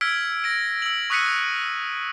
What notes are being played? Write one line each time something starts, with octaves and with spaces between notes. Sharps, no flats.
E6 F6 G#6 B6 D7
A#6 D7
E6 F#7
C#6 D#6 F#6 B6 C#7 D#7